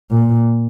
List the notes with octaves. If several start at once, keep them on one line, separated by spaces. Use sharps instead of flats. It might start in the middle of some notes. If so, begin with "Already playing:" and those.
A#2